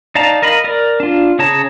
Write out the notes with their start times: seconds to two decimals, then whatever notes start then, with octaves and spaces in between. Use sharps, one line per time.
0.15 D#4 D5 F5 A5 A#5
0.42 A#4 D#5 F5 B5
0.64 A#4 D5
1.00 D4 F4
1.39 C#3 G#4 C#5 A5 A#5